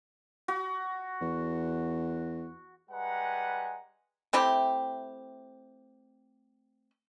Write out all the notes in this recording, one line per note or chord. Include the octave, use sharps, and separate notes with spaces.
F#4
E2
G3 G#3 B4 F#5 G#5 A#5
A3 C4 E4 G4